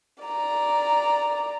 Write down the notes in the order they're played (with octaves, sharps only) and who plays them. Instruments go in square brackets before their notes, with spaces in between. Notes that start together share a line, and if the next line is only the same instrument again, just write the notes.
[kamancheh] D5 A#5